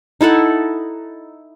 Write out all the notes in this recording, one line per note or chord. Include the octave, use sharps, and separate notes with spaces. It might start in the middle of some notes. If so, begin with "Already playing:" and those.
D#4 E4 A4 F#5